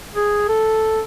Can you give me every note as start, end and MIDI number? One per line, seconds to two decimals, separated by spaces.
0.16 0.46 68
0.49 1.02 69